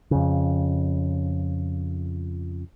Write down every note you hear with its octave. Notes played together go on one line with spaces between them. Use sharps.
F2 C#3